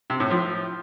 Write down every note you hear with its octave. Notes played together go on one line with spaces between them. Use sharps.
C3
A2
F3